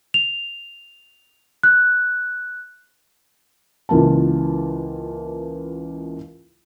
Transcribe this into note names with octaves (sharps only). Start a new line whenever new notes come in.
F7
F#6
C#2 E3 A#3 F4 A5